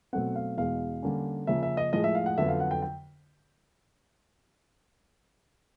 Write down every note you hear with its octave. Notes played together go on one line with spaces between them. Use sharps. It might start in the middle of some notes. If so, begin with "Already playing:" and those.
B2 F#3 A3 C4 F#5
F5
E2 B2 G#3 F5
D3 G3 A#3 C#4
C#3 F3 A#3 C#4 E5
E5
D#5
A2 F3 G#3 D#5
E5
F5
F#5
F2 D3 F#3 B3 E5
F5
F#5
G5
G5